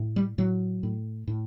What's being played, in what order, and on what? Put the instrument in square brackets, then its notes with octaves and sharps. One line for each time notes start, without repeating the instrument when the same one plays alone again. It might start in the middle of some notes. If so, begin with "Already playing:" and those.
Already playing: [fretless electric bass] A2
G3
A2 F#3
A2
A2